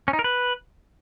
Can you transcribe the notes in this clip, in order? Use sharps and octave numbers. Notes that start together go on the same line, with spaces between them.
C#4
D#4
A#4
B4